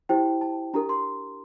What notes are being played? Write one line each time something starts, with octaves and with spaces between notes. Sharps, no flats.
E4 G4 C5 G5
A5
D4 G4 A#4 A#5
C6